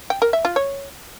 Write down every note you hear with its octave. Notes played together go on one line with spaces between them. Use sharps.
G5
A#4
E5
F4
C#5